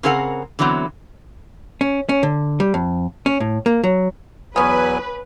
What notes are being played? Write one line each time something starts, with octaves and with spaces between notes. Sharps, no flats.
C#3 C4 G#4 A#4 C5 F#5
D3 E3 F#3 B3 C4
C#4
C#4
D3
G3
F2
C#4
A2
A#3
F#3
E2 F#3 B3 C#4 B4 G#5